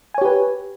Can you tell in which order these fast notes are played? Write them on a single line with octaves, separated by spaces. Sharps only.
G#5 C#5 G4 B4